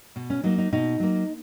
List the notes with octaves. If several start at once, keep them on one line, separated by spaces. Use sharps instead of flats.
B2
C#4
F#3 A#3 D#4
D#4
B2 D#4
F#3 A#3